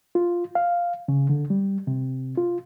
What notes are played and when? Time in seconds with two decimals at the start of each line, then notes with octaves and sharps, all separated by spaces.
0.15 F4
0.55 F5
1.08 C#3
1.29 D3
1.50 G3
1.87 C3
2.38 F4